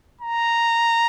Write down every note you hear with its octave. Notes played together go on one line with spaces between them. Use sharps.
A#5